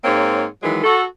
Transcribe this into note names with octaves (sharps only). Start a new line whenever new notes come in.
G#2 A#3 C4 C#5
D#3 E3 F#3 G#3
F#4 A4